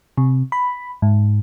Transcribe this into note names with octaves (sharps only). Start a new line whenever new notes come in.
C3
B5
G#2